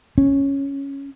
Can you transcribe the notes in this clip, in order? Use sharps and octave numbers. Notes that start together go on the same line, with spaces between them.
C#4